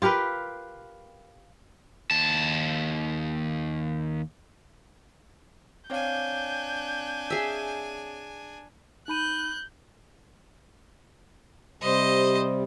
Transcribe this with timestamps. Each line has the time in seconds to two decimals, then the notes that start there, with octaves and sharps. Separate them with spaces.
0.02 F4 G4 A#4 B4
2.11 D#2 A5
5.90 C4 D4 C#5 F5 G#5 G6
7.30 G#4 E5
9.08 D#4 B5 F#6 G6 D#7
11.82 C3 G3 C5 D#5